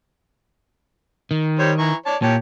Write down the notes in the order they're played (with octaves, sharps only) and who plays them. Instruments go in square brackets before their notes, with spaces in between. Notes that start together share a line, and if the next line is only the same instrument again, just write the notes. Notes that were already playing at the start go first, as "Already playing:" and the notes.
[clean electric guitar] D#3
[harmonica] G3 C5 C#5
E3 A#5 C#6
C#5 D5 A5
[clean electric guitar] A#2 [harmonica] G4 C#5 A5